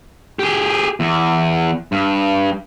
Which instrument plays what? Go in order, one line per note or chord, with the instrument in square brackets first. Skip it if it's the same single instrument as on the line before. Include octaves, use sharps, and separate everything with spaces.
[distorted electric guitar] G4 G#4
E2
G2